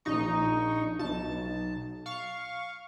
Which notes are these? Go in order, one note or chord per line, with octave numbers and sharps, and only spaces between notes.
A#1 D#4 C#6
B1 A5
F5 C#6